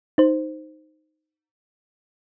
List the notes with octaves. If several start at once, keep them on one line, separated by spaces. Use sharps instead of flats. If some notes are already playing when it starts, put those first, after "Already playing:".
D#4 C5